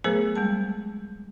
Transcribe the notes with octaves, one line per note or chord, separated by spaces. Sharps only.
F#3 A3 B3 G#4 A#4 C5
G3 G#3 A5